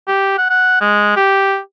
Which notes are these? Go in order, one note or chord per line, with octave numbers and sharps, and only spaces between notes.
G4
F#5
F#5
G#3
G4